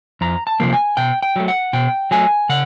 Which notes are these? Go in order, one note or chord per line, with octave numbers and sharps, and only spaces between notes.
F2 A#5
A5
C3 F3 A#3
G#5
B2 G5
G5
F#3 A3
F#5
B2 G5
F#3 A3 G#5
C#3 F#5